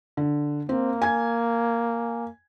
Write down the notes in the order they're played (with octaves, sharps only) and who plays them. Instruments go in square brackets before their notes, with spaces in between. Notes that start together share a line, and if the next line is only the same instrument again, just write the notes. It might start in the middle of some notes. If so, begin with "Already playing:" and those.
[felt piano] D3
[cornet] A#3 [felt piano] C4
[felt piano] G#5 G#6